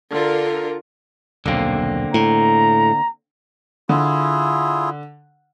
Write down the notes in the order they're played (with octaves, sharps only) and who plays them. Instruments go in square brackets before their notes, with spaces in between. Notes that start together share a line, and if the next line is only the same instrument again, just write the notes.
[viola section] D3 F4 A#4
[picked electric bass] D#1 B1 [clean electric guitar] D3 A#3 C4
[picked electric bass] A2 [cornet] A#5
[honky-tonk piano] D3 [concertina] E4 F4 G#4